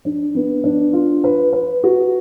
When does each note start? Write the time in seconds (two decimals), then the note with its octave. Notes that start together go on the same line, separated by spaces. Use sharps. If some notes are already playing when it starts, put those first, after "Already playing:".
0.05 D4
0.35 B3
0.64 D4
0.93 F4
1.24 B4
1.53 B4
1.84 F#4